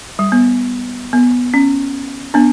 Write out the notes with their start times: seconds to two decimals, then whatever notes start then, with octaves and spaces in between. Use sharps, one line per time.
0.19 G3
0.32 B3
1.13 B3
1.54 C#4
2.34 B3 D4